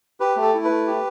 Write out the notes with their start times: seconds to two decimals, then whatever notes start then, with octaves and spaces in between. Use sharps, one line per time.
0.20 G4 B4
0.36 A3
0.42 A4
0.54 E4
0.65 B4
0.70 A3
0.87 G4